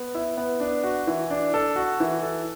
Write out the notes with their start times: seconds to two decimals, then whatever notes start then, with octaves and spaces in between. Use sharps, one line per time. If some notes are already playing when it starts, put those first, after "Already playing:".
Already playing: B3
0.15 E4
0.37 B3
0.60 D4
0.84 F#4
1.07 E3
1.31 D4
1.54 A4
1.76 F#4
2.00 E3
2.23 A4